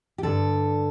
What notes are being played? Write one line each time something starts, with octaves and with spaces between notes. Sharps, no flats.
G4
G2 D3 A4